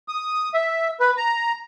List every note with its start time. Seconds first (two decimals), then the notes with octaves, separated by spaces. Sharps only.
0.08 D#6
0.54 E5
1.00 B4
1.17 A#5